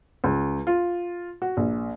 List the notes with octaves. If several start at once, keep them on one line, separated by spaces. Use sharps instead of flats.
C#2
F4
F#4
A#1